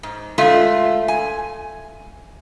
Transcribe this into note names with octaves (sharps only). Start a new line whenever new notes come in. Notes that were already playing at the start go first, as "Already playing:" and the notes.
G#2
G#3 A3 F4 E5
G#5